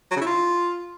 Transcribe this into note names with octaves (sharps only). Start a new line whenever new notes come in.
F#3
C#3
E4
F4